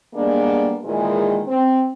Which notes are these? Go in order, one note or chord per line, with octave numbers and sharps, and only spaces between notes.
D3 G3 G#3 A#3 B3 D4
A#2 D#3 E3 G#3
C4